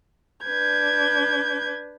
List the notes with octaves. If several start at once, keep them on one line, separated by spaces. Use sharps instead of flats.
D4 B4 G6 G#6